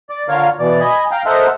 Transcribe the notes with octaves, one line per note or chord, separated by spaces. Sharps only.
D5
D3 F4 A#4 C#5 F5
B2 E3 D5
D#5 G#5 B5
F5 G5 A#5
A4 A#4 C5 D#5 E5 F#5